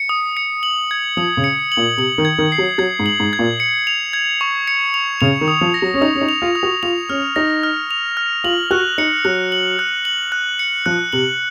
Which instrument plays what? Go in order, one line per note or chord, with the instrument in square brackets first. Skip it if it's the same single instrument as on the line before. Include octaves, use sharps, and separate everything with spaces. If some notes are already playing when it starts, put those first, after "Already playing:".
Already playing: [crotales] C#7
D#6
C#7
F#7
G#6
[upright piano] F3 [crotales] D#6
[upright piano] C#3
[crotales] C#7
F#7
[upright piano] A#2
[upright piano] C3 [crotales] F#7
[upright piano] D#3
[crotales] G#6
[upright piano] D#3
[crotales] C7
[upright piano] F#3
[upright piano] F#3 [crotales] G#6
[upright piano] G#2
[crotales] F#7
[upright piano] G#2
[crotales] G#6
[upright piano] A#2
[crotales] C#7
F7
G#6
C#6
C#7
F7
[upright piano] C#3 [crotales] F7
[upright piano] D#3
[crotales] D#6
[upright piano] F3
[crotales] A#6
[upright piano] F#3
C#4
[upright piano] D#4 [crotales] D#6
[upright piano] C#4
D#4
[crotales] F7
[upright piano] F4
[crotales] D#6
[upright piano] F#4
[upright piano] F4 [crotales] F7
[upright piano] C#4 [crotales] F6
[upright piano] D#4 [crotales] A#6
[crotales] F6
F7
F6
[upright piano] F4 [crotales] F#7
[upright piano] F#4 [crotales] F#6
[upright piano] D#4 [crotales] C#7
[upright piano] F#3 [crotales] F#6
[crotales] F#7
F#6
F#7
F#6
C#7
[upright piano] F3 [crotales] F#6
[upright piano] C3 [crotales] F#7